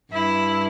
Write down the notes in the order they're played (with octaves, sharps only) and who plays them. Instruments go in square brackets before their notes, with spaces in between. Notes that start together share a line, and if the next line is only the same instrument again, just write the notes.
[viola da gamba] G2 [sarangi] E4